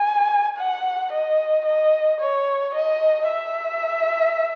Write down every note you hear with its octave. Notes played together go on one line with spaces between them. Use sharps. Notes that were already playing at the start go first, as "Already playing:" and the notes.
Already playing: G#5
F#5
D#5
D#5
C#5
D#5
E5